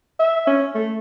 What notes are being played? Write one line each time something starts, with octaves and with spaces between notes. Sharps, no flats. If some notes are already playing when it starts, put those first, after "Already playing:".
E5
C#4
A3